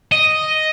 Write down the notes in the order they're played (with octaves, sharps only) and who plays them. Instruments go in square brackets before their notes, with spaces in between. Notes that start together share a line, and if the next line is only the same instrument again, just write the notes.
[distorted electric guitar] D#5